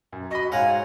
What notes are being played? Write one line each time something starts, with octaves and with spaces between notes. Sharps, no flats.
F#2
F#4 D#5 B5 C#6
G#2 C#5 F5 F#5 G#5